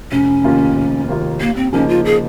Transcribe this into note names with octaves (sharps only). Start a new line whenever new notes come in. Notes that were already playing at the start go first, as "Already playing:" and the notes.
F1 C#4
D#2 D#3 A#3 F4
F1
D#2 D#3 A#3 F4
D#2 A#3
C4
C#3 F3 A#3 C#4 D#4
F4
G#4